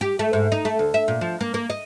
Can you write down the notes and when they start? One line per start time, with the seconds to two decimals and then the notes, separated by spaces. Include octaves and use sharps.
0.01 G4
0.19 A3
0.33 G#2
0.52 D#4
0.65 A3
0.79 D2
0.94 E5
1.08 A#2
1.21 F3
1.41 A#3
1.54 A#3
1.70 D#5